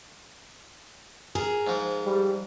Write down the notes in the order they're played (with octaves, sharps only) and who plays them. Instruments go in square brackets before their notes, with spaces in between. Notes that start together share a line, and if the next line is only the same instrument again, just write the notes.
[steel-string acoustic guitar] G#4 A#4
[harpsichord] G#2 F3
[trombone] G3